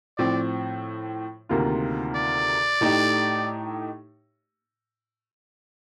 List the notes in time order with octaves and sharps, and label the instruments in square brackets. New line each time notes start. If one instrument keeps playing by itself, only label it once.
[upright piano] A2 F3 C4 [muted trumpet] D5
[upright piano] D2 C3 D#3 A#3 F4
[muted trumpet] D5
[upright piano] A2 A3 D#4 G4